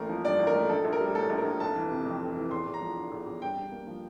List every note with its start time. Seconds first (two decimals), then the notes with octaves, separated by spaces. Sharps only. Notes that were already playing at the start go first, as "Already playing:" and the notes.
Already playing: A1 A3 A#3 A#4
0.09 F3
0.25 G2 D5
0.39 A1
0.47 A#4
0.55 A3
0.69 A#1 A4
0.85 A#1
0.92 A#4
1.00 G3
1.15 A2 A4
1.30 A#1
1.38 A#4
1.45 A#1
1.60 F1 A5
1.76 E3
1.91 C3
2.05 F2
2.21 F1
2.36 E3
2.51 E2 C6
2.66 E2
2.74 A#5
2.81 F3
2.96 D3
3.12 E2
3.27 E2
3.42 G2 G5
3.57 G2
3.71 A#3
3.87 F3